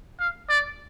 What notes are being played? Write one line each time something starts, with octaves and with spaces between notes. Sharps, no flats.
F5
D5